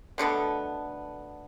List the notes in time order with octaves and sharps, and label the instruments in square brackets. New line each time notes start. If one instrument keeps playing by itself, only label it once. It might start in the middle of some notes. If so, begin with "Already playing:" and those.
[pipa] B2 D3 A3 B3